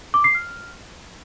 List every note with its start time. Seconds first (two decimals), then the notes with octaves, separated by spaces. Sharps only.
0.14 D6
0.24 C7
0.35 F6